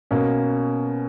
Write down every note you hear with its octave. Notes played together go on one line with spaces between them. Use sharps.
B2 A#3 C#4